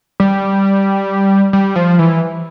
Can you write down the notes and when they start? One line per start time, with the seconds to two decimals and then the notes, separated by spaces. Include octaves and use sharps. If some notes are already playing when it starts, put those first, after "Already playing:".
0.20 G3
1.53 G3
1.76 F3
1.99 E3